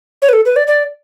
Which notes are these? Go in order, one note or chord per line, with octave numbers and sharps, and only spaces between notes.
C#5
B4
A4
B4
D5
D5